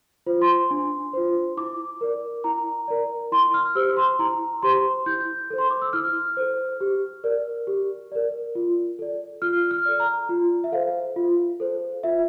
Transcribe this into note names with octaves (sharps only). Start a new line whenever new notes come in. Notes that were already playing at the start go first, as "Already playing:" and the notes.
F4 C5
C6
D4
F4 C5
E4 D6
A#4 D5
E4 A#5
A#4 D5
E4 C6
F6
G4 C5 E6
C6
E4 A#5
G4 C5 C6
E4 G6
A4 C5
C6
D6
E6
E4 F6
A4 C5
G4
A#4 D5
G4
A#4 D5
F4
A4 D5
F4 F6
F6
A4 D5
A#5
F4
E5
A4 C5 F5
F4
A4 C5
F4 E5